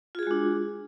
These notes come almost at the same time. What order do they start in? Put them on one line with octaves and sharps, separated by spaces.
F4 G#4 F#4 G#3 D4